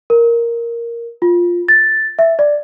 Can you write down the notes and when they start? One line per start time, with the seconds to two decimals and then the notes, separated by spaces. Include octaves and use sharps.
0.10 A#4
1.22 F4
1.68 A6
2.19 E5
2.39 D5